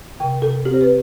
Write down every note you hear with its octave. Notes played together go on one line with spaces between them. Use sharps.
C3 G5
C3 A4
C4 G4
C5
B4